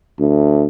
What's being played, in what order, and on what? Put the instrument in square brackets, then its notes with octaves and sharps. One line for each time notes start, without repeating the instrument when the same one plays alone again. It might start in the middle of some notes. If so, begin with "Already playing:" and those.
[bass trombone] D2